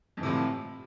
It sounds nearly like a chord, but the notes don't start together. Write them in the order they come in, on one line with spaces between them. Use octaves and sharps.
F2 E3 C3 A2 F3